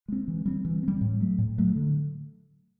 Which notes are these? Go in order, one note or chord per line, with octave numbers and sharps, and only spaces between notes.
G#3 C4
E3
G3 C4
E3
G3 C4
A2
F#3 A3
A2
F#3 A3
D3